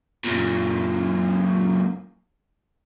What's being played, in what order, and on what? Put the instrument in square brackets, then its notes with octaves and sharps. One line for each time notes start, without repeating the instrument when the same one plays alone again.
[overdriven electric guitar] F#2 A#2